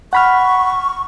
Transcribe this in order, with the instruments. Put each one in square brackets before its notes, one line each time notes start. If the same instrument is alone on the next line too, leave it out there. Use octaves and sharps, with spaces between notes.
[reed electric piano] F#5 B5 F6 [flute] C#6